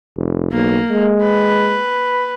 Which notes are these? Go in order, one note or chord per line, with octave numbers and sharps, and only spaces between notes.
F1
B1 A#3
G#3
B4